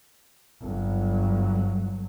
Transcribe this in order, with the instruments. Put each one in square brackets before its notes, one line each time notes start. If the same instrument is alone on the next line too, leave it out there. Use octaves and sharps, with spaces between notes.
[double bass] G1 F#3